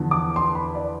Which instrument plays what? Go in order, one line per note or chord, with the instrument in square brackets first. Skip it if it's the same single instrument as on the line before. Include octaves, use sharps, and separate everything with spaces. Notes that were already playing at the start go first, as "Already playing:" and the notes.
Already playing: [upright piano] E2 D3 F3
D6
C6
B5
D5